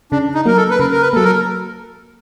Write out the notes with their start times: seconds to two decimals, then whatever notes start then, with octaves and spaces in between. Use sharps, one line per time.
0.12 C#3 D4
0.34 D#4
0.45 F#3 A#3 A#4
0.57 A4
0.71 B4
0.79 C#3 A#4
0.92 A#4
1.02 B4
1.13 F#3 A#3 A4
1.25 A#4